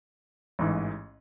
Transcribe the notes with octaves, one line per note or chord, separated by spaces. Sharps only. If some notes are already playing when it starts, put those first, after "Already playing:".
A1 G#2 E3